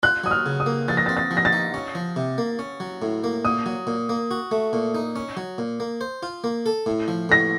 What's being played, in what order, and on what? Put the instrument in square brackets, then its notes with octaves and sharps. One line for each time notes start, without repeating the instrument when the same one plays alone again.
[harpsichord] F4 [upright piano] F#6
[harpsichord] F#3 [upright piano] D#6
[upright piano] F6
[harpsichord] C#3
[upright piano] D#6
[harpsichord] A#3
[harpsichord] F3 [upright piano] A6
[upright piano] A#6
A6
[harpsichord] C4
[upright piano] A6
[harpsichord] F3
[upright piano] A#6
A6
[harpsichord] D#4
C#4
F3
C3
A#3
C#4
F#3
A2
A#3
[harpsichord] A#2 [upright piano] D#6
[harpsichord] F#3
A#2
A#3
F#4
A3
A#2
D#4
C#4
F#3
A#2
A#3
C5
F4
A#3
A4
A2
F3
[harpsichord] A2 [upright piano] A#6